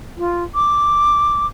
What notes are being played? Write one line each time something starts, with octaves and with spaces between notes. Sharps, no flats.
F4
D6